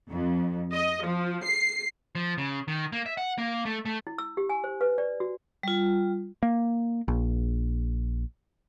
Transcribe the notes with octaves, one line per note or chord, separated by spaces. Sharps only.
F2
D#5
F3
C7
F3
C#3
D#3
A#3
E5
F#5
A#3
A3
A3
E4
E6
G4
G#5
C5
B4
D5
F#4
G3 F4
A#3
A#1